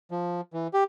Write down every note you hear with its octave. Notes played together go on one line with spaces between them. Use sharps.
F3
E3
G4